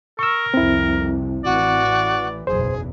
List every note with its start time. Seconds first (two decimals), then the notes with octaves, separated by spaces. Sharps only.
0.19 A#4 C#6 E6
0.54 C2 F2 C3 C4 E4
1.44 A1 E3 F#4 D5
2.47 F#1 B1 E2 G#4 C5